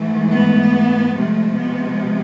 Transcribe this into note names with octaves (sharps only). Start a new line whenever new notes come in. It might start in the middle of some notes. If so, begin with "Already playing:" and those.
Already playing: G#2 E3 A3
B3
C3 F3 G#3 A3
B3